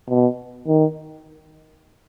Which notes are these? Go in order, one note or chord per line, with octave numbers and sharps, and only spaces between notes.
B2
D#3